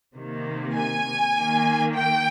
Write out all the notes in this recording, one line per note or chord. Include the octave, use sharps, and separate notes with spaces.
C3 D#3 A#3
G#5
D#3 A#3
G5